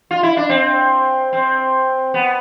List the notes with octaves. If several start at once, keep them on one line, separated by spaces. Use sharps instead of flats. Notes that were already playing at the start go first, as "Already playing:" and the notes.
F4
E4
D4
C4
C4
B3